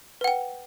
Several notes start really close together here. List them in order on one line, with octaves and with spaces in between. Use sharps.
B4 F#5 G5